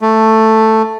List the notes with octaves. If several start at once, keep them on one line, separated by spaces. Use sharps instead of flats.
A3